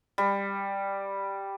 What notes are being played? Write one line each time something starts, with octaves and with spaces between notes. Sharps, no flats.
G3